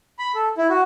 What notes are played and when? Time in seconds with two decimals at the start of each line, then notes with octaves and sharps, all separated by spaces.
0.19 B5
0.35 A4
0.58 E4
0.70 F#4